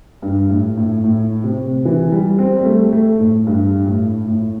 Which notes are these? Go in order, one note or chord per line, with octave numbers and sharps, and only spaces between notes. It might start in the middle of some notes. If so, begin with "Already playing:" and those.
G2
A2
A2
A2
C3
E3
G3
C4
G3
A3
A3
A2
G2
A2
A2